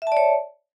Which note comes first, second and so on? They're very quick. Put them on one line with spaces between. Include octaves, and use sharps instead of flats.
E5 A5 D5 C#5